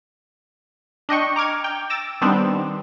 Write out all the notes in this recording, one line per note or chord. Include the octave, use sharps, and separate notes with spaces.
D4 D#5 G5 C#6
A#5 D6 F6 G#6
G5
E6 A6 A#6 D7
D#3 G3 B3 C4 D4